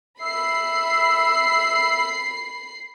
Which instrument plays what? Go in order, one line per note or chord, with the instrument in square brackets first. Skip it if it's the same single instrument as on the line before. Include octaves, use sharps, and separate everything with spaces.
[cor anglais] E5 [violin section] B5 C7